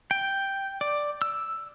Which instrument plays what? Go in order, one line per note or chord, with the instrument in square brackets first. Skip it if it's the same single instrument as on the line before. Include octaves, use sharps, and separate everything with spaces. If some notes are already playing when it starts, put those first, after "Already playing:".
[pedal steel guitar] G5
D5
E6